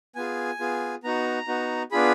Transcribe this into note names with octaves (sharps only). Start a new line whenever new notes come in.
B3 F4 G#4 G#5
B3 F4 G#4
B3 D#4 F#4 A#5
B3 D#4 F#4
B3 D4 F4 G#4 B5